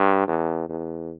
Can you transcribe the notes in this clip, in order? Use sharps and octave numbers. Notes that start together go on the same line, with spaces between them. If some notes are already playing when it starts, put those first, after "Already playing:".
Already playing: G2
E2
E2